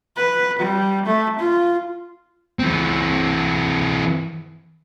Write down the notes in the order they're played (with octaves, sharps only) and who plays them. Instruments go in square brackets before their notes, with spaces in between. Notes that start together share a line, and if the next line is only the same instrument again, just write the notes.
[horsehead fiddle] B4
G3
A3
F4
[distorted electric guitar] E3 C4